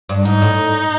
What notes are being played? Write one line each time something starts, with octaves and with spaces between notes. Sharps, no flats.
G2
G#2 D#4
A2